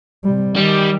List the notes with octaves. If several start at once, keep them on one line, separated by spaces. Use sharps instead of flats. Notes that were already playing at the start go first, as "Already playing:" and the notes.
C3 G3
D#3 G3